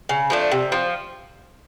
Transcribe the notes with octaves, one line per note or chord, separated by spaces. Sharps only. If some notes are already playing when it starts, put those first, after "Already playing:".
C#3
F3 A3 D4
C3
F3